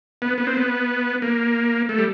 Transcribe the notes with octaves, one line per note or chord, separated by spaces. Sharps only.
B3
B3
C4
B3
A#3
A3
G3